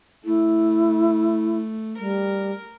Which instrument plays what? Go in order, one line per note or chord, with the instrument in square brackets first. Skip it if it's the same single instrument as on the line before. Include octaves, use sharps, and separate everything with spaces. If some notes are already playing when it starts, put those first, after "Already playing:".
[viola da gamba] A3 [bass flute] E4
[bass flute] G3 [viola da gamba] A#4